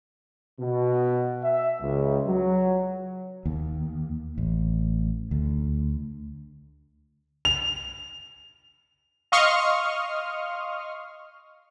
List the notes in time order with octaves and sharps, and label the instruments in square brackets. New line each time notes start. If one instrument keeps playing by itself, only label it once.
[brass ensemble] B2
E5
C#2
F#3
[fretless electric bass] D#2
A1
D2
[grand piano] F7
[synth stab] D#5 F5 C6 C#6 D#6 F6